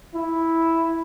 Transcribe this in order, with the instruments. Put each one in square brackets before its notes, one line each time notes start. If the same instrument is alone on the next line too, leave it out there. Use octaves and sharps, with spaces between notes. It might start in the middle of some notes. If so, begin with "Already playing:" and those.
[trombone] E4